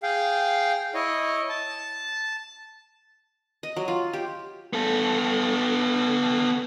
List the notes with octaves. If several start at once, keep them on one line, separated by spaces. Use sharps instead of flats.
G#4 F5 G5
E4 C#5 D#5
A5
D#5
F#3
F4
G4
B3 A4